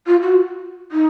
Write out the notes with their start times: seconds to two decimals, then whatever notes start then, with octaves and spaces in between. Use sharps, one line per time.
0.07 F4
0.22 F#4
0.92 D#4